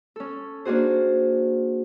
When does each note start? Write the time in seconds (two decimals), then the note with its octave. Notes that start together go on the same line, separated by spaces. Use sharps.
0.16 C#4 A4
0.65 A#3 D4 D#4 F#4 G#4 C5